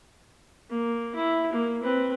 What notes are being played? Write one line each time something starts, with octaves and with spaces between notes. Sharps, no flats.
A#3
E4
A#3
C4 B4